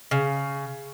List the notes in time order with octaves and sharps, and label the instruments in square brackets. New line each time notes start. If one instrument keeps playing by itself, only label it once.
[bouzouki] C#3